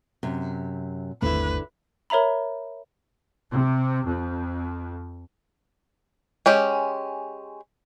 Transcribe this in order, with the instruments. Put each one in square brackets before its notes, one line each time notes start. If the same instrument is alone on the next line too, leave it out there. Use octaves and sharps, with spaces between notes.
[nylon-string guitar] F#2 C3
[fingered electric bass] G1 D#2 A3 [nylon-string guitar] D3 C4 E4 [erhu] B4
[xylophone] A#4 C#5 E5 A#5 B5
[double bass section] C3
F2
[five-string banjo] G#3 C#4 G4